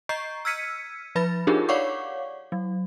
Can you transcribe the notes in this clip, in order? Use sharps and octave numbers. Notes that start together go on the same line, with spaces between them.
D#5 A#5 C#6 G6 C7
E6 F6 G#6 B6 C#7 D#7
F3 B4 B5 A6
D4 D#4 F4 G4 G#4 A#4
C#5 D5 F5 F#5 C#6 D6
F#3